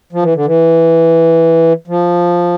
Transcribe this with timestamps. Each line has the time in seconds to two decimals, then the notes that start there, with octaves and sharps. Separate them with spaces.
0.13 F3
0.23 E3
0.35 D3
0.45 E3
1.87 F3